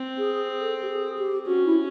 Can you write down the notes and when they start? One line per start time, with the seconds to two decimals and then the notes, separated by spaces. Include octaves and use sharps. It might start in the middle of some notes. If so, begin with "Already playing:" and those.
Already playing: C4
0.18 G#4
0.60 A4
0.83 G4
0.89 G#4
1.18 G4
1.46 C#4 F#4
1.66 E4